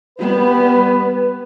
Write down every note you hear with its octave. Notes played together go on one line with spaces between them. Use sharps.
G3 B3 B4